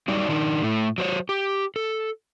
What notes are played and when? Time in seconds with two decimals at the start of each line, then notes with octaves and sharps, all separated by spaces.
0.08 F#3 G3 D#4 D5
0.29 D#3 D4 D#4
0.62 A2 A3
0.98 F#3 C5 C#5
1.29 G4
1.76 A4